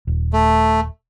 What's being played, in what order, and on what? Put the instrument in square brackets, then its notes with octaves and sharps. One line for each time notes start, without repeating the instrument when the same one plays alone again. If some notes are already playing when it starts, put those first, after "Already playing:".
[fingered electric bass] D#1
[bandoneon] A3